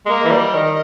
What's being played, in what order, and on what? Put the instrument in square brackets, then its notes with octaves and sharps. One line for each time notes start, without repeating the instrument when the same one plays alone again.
[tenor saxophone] G#3
[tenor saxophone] A#3 [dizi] D#5
[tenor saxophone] E3
G3
D#3